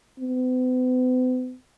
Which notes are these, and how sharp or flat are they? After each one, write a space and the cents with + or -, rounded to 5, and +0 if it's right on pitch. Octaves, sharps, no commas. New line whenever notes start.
B3 +45